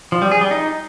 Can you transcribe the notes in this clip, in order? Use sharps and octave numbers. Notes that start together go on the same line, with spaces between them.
F3
G3
G#4
G3
D#4